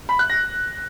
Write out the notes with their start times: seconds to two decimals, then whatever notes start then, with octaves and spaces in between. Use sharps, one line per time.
0.09 B5
0.19 F#6
0.30 A#6